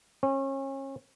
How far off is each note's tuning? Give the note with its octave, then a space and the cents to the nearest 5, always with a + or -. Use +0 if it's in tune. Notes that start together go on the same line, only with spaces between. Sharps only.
C#4 -35